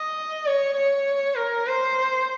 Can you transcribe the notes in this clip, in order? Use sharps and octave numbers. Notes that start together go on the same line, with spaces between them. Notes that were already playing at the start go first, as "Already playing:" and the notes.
Already playing: D#5
C#5
C#5
A#4
C5